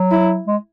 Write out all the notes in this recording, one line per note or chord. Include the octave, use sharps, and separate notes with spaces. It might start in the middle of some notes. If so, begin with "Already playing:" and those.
Already playing: F#3
E4
G#3